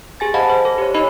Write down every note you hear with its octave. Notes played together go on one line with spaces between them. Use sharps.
G4 G#4 G#5 A6
C5 D#5 F5 F#5 A5 B5
C5
A4
G4 C#5
D#4 C#5 D#5 B5